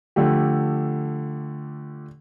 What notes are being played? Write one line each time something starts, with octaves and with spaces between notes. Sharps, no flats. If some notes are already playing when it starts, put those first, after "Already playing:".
D3 F3 A3 G4